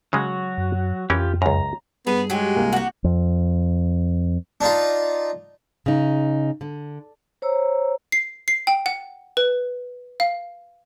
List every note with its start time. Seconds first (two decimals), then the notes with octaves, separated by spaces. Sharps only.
0.13 C#3 F#3 G#3 F#4
0.58 F#2
1.10 F2 E3 C#4 F4 G4 A#4
1.42 C#2 F#2 A#5
2.07 G2 B3 G#4
2.30 F#3 G#3 G4
2.55 C2 A#3 G#5
2.73 F#4 G4
3.04 F2
4.61 D4 D#4 F4
5.86 C#3 D#4
6.61 D3
7.42 C5 C#5 A#5 E6
8.12 C7
8.48 C7
8.67 G5
8.86 F#5
9.37 B4
10.20 F5